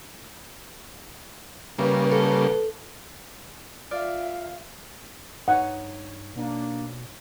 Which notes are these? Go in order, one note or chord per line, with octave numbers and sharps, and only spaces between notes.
C#3 G3 A#3 B4 E5
A4
F4 D5 E5 F5
G2 D#4 C#5 F#5
B2 A#3 D4